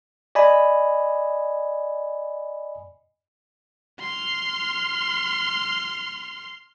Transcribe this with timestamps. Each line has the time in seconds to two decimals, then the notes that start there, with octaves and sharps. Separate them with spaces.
0.35 D5 D#5 G#5 B5
4.00 C6 F6